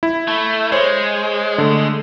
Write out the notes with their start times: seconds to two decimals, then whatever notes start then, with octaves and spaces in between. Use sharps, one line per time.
0.03 E4
0.28 A3
0.72 G#3 C5 C#5
1.58 D3 A3